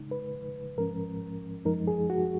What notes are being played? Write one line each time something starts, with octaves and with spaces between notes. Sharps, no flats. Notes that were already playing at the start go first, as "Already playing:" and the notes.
Already playing: C#3 G#3 D#4
B4
G#2 F3 G#3 C#4 A#4
F#2 F3 G#3 D#4 A#4
G#4
F#4